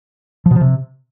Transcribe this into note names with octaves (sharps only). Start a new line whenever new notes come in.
F3
B2
F3
C3